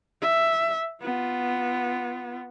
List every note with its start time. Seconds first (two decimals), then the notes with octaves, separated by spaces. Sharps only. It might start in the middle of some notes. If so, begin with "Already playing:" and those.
0.21 E5
1.02 B3 F4